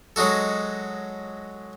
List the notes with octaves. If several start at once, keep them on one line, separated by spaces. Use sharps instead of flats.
F#3 G#3 D#4 F#4 A4